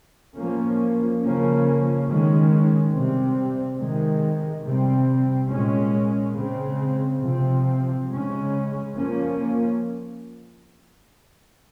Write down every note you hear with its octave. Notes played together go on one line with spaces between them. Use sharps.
F3 A#3 C#4
C#3 F3 A#3 C#4
D#3 G#3 C#4
C3 G3 C4
C3 D#3 G#3
C3 G3 C4
A#2 G#3 C#4
C#3 G#3 C4
C3 F3 C4
C#3 G#3 C#4
F3 A#3 C#4